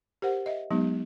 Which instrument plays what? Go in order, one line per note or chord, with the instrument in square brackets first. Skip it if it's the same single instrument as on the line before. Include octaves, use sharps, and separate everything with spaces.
[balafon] G4 A#4 C5 F#5
D#5 E5
F#3 G#3 B3 D#4 G4